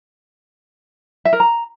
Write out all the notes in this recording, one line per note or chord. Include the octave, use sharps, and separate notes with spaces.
E5
A#4
A#5